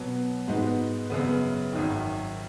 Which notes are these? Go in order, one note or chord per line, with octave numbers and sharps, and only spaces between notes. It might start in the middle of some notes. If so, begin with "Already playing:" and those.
Already playing: B2 F#3 B3
G#2 G#3 B3 D#4 F#4
F#2 C#3 B3
G#1 F#2 D#3